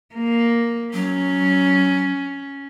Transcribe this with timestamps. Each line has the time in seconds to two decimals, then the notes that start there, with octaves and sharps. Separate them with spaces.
0.15 A#3
0.93 F#3 C#4